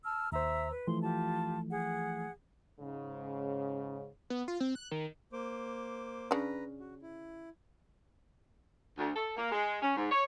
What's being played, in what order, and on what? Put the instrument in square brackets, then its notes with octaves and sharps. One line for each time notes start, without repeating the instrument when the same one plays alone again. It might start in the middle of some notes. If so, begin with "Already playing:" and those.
[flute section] A5 E6 F6
[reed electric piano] D#2 C5 [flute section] E5 A#5 E6
[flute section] B4
[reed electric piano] E3 F3 A3 [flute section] C6
[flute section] F4 G4 A5
G#4 F#5
[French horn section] G#2 C#3
[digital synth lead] B3
F4
C4
F#6
D#3
[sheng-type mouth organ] A#3 C5 D6
[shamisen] C#3 D4 [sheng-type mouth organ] B4 A#5
[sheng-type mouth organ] F#4
E4
[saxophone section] D2
A4
A#3
G#3
C#4
G#2
C#5